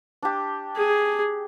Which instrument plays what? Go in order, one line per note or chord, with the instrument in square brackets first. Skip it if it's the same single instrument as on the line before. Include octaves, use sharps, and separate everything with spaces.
[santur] D4 G4
[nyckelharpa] G#4